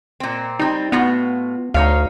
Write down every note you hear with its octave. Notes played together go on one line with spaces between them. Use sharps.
A#2 C4
G3 C4 D#4
A2 B3 F4 F#4
D2 D#4 C#5 F5